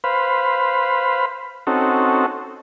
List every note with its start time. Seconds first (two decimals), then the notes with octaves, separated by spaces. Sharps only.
0.04 B4 C5 F5 B5
1.67 C4 C#4 D#4 F#4 A4